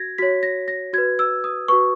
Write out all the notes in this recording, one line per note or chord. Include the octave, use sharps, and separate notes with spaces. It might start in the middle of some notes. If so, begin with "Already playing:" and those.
Already playing: F#4 G#6 A#6
F#4 C#5 B6
A#6
A#6
F#4 B4 G#6
E6
D#6
F#4 B4 C#6